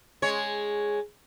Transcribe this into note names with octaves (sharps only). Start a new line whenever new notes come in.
G#3 C#5